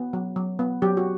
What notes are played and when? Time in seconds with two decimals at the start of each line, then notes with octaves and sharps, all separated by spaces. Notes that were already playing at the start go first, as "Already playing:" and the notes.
Already playing: B3
0.13 F#3
0.36 F#3
0.59 B3
0.82 F#3 G4
0.97 F#4